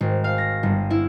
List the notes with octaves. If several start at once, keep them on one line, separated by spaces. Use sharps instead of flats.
G#1
F5
A#6
G1
E4